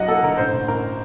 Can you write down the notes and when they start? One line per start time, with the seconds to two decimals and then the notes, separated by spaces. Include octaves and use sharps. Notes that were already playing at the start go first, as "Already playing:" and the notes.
Already playing: G2 F#3 D#5 F#5
0.08 A#3 A4
0.23 D3 A#4
0.38 A1 C5
0.53 A1
0.68 A1 A#4